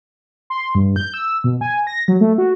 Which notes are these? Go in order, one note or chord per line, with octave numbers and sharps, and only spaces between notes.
C6
G2
G6
E6
B2
G#5
A#6
F#3
A3
F#4